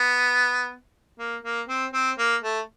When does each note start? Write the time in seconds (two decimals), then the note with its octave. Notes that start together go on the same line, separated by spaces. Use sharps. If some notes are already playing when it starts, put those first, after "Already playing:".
Already playing: B3
1.19 A#3
1.44 A#3
1.68 C4
1.94 C4
2.18 A#3
2.43 A3